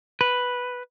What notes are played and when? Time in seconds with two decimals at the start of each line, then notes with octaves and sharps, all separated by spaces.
0.21 B4